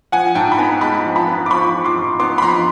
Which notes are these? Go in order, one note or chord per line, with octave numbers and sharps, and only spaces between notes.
F3 F#5 G#5
G#2 G5 A5
B5
B3 G#5 A#5
G#3 A5 B5
F3
A5 B5
B3
D6
F3 B5 C#6
F3
C6 D6
G#2
B3 C6 D6
B5
F3 A#5 C6